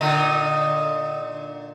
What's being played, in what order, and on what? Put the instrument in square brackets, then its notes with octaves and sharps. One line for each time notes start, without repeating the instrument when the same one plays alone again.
[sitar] A#2 D3 D#4